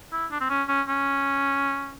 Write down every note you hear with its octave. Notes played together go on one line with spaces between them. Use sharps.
E4
D4
C4
C#4
C#4
C#4